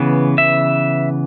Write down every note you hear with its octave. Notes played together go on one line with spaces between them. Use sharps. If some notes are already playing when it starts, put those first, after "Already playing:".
Already playing: C#3 E3 B3
E5